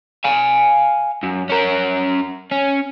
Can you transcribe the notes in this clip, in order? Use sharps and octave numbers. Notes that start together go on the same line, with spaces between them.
F5 G#5
F#2
C#4 A#4
C#4